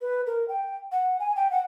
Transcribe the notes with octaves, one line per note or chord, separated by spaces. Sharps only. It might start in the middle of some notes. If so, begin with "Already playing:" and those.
B4
A#4
G5
F#5
G#5
G5
F#5